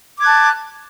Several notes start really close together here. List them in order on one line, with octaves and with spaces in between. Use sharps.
D6 G#6 F#6 A5